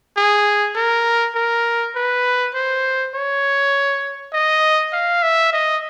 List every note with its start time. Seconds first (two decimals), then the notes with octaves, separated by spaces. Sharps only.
0.17 G#4
0.76 A#4
1.35 A#4
1.95 B4
2.54 C5
3.15 C#5
4.33 D#5
4.93 F5
5.23 E5
5.53 D#5